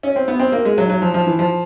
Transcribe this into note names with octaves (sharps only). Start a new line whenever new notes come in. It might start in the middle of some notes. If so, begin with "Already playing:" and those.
C#4
C4
B3
C4
A#3
G#3
F#3
F#3
F3
F3
E3
F3